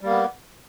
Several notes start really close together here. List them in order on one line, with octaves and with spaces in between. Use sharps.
G3 A#3 B3